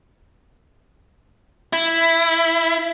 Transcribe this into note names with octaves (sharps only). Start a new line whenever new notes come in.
E4